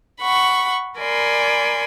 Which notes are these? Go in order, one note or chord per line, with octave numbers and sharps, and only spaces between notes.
F#5 B5 C#6
A#4 D5 G#5 B5 C6